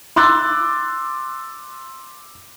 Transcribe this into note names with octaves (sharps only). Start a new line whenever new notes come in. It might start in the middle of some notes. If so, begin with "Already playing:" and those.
C6 D6 E6 F#6 A6